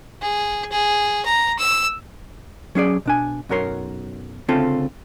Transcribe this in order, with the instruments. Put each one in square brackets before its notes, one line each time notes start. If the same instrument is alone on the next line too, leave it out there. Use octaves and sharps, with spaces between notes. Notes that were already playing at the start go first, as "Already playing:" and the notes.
[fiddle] G#4
G#4
A#5
E6
[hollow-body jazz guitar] F#3 C#4 G#4 D5
B2 D4 G#5
B1 F#2 F#3 A#4 C#5 C6
D2 C#3 C4 C#4 F4 A4